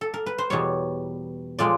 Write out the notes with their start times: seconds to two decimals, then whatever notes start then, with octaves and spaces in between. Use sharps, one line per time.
0.01 A4
0.14 A#4
0.26 B4
0.38 C5
0.50 E2 B2 G3 C#5
1.59 A#2 F3 G#3 D5